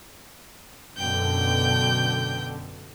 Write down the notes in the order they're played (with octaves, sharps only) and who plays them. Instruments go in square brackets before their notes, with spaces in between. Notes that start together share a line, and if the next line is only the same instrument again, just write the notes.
[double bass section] F#2 B2 D3 [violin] G5 G6